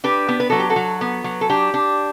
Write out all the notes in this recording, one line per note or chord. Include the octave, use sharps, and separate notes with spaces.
D4 G4 B4
B3
B4
F#3 A4
G4
F#4 A4
F#3
B3
F#3
A4
D4 G4
D4